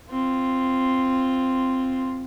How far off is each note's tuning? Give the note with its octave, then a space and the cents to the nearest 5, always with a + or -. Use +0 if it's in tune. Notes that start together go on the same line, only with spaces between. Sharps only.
C4 +0 F4 +0